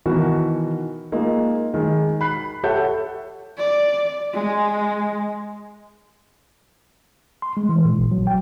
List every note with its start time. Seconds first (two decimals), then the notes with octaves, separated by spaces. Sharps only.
0.06 B2 D#3 E3 F#4 A#4
1.12 G#3 A#3 D#4 F4
1.74 D#3 G#3
2.21 B5 F#6 C7
2.63 G4 A4 C#5 E5 F#5 G6
3.58 D5
4.34 G#3
7.42 C6
7.57 G#3
7.69 E3
7.85 A#2
7.99 A1
8.11 F#3
8.27 G5